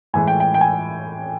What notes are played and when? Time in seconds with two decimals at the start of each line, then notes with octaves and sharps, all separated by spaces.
0.14 A2 E3 G#3 G#5
0.28 G5
0.40 G5
0.54 G5
0.61 G#5